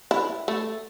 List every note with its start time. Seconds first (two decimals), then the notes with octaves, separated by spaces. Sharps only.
0.11 E4
0.48 A3